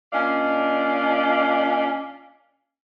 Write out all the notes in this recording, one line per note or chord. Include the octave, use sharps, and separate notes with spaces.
A#2 C#4 D4 D5 D#5 F5